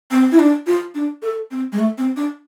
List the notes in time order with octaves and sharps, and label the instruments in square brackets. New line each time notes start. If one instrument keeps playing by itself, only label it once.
[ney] C4
E4
D4
F4
D4
A4
C4
G#3
A3
C4
D4